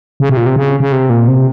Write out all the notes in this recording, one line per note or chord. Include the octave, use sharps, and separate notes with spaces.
C#3
C3
A#2
C3
C#3
C#3
C3
A#2
C3